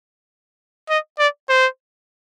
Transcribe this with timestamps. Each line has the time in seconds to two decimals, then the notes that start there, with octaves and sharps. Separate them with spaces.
0.89 D#5
1.19 D5
1.49 C5